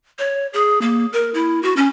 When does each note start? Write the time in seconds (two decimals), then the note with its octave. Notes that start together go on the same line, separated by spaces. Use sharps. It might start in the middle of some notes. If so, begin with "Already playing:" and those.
0.19 C#5
0.53 G#4
0.82 A#3
1.13 A#4
1.34 E4
1.63 F#4
1.77 C#4